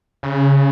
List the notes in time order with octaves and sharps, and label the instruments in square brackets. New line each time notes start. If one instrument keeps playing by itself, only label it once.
[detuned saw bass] C#3